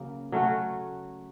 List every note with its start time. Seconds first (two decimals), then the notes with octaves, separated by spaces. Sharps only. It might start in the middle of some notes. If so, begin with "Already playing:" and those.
Already playing: C#3 F#3 A#3
0.32 F#3 A3 C#4 F#4